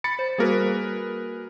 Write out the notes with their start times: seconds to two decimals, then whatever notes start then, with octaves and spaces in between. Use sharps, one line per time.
0.04 B5 A6 C#7
0.19 C5
0.38 G3 A#3 F#4 G#4 A#4 B4